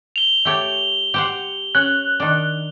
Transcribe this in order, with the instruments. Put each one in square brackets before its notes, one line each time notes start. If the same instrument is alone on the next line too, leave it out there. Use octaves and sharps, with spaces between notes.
[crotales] F7 G7
[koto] A3 G4 C#5
G4 C5 F#5
[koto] C#4 [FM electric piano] F#6
[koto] D#3 D4